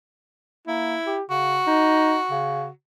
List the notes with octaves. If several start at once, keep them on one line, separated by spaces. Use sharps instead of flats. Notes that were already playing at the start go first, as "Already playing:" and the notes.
A#3 E4
G4
C#3 F#4
D#4
C#3